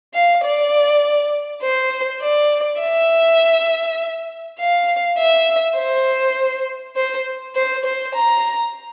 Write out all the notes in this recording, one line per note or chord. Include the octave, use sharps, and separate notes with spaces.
F5
D5
C5
D5
E5
F5
E5
C5
C5
C5
C5
A#5